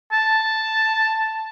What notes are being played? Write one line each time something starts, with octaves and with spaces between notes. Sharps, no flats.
A5